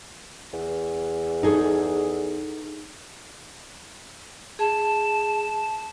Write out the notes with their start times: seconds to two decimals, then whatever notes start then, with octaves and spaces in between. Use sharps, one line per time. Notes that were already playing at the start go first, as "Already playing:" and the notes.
0.53 E2
1.43 D#4 G#4 A4
4.59 G#4 A5